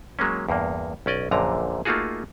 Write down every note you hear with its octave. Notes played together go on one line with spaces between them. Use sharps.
F#3 G#3 A#3 C#4
E2 G2 A#3
B1 C#4 D5 D#5
A#1 F#2 A#2 D3 A#5
A3 A#3 D#4 F4 F#4 G#4